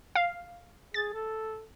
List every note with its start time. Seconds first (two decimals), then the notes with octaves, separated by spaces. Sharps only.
0.15 F5
0.94 G#4 A6
1.13 A4